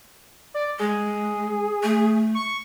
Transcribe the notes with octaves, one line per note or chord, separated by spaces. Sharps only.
D5
G#3 G#4
A3
C#6